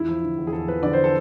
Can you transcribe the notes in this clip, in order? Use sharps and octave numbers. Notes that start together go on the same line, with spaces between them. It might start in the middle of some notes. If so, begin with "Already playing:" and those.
Already playing: E2 E4
F3
D3
E2
G#4
E2 A4
F3 B4
D3 D5
C5
A4